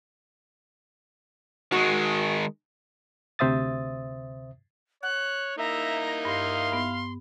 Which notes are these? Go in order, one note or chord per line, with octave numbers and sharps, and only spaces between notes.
D#3 G#3 F#4
D2 C3 C5 E5 D#6 A6
C#5 F#5 F#6
A#3 D#4 E4 E5 A#5
G2 F5 C6
G2 B3